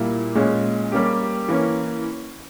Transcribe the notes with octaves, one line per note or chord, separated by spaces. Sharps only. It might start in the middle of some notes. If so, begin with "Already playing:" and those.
Already playing: A#2 G3 A#3 E4
A#2 G#3 C#4
G3 A#3 C#4 G4
E3 A#3 C#4